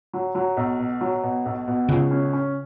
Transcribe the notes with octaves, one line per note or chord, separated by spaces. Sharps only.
F#3
F#3
B1
B2
F#3
B2
B1
B2
C#2 C#3
C#4
C#4